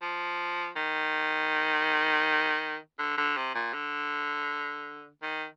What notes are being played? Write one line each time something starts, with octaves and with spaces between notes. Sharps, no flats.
F3
D#3
D3
D3
C3
A#2
D3
D#3